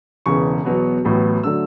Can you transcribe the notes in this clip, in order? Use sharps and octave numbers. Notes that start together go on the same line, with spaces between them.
E1 E2 C#3 E3 C#6
E2 B2 F#3 B3
A1 A2 F#3 B3
D3 F#3 A3 E6